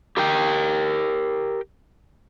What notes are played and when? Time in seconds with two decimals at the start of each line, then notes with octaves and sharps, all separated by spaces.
0.17 G4 A#4 G5